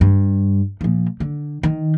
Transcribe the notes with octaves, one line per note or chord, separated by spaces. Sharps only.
G2
A#2 F3
D3
D#3